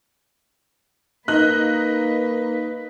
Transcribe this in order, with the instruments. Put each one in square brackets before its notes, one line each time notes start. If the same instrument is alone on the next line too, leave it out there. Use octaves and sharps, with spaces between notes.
[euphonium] A#3 [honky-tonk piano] D#4 [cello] B4 [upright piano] F#6